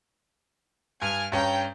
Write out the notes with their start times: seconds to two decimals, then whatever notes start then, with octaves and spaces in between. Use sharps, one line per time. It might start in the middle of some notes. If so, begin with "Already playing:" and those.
1.02 G2 G#5 F6
1.32 G2 C#4 G5 A#5